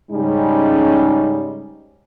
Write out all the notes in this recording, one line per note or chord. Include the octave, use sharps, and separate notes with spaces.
G#2 C#3 G3 G#3 C#4 D#4